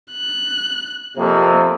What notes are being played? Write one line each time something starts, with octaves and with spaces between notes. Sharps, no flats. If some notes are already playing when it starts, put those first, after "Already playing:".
F#6
F2 C3 A#3